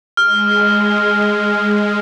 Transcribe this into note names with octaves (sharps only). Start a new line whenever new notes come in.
G#3 F6